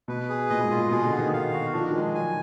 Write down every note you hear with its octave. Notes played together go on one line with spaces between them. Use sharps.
B2 B4
G#4
A#2 D#5
G#2
F4
A#2
B2 G#4
D3
B3
D#3
F5
F#4
F3 D4
D#3
F3 G#3
F#3 G#5